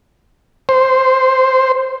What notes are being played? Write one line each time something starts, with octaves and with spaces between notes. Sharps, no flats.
C5